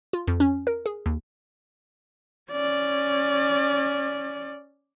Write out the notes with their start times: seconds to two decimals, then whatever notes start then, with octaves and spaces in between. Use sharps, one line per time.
0.13 F4
0.27 F2
0.40 C#4
0.67 A#4
0.86 G#4
1.06 D#2
2.52 C#4 D5